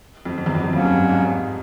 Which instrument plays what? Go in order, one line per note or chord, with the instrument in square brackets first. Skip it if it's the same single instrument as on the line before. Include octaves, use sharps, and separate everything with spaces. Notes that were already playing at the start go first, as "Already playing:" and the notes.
[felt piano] F2
F2
E2
F2
E2
[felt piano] F2 [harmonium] F#3 A#3 C#4
[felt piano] G2
G#2
G#2